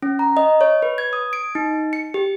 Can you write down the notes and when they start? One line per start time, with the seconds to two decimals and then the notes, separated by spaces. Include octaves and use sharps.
0.02 C#4
0.19 A#5
0.37 D#5
0.61 C#5
0.82 B4
0.98 G#6
1.13 D#6
1.33 D7
1.55 D#4
1.93 C#7
2.14 G4